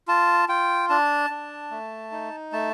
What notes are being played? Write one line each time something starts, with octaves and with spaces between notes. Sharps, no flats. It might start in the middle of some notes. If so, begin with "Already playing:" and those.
F4 A5
F4 G5
D4 A5
D4
A3
D#4
A3 A5